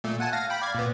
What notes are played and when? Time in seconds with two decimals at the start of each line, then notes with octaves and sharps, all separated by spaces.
0.04 A#2 A3
0.20 F#5 G#5 A5
0.33 F5 A#6
0.50 G5 B5
0.62 D5 F5 G#6
0.75 A#2 B3